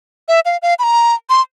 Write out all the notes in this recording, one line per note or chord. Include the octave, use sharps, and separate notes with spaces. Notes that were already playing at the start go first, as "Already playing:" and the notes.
E5
F5
F5
B5
A#5
C6